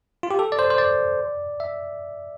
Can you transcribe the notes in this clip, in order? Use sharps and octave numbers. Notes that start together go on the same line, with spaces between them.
F4
G4
A4
D5
C5
C5
D5
E5